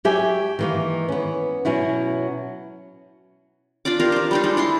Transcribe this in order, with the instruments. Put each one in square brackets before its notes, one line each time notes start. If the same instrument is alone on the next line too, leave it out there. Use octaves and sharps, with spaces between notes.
[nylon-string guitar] F#3 G4 E5 G#5
D#3 E3 A#3
B3 C#4
B2 F#3 C#4 E4 F#4
[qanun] D4 F4 D5 D6
F4 G4 A#4
C5 D5
G3 D4 D#4
G#3 D#4
D4 E4 C6